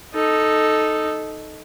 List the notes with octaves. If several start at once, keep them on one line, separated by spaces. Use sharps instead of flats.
D#4 A4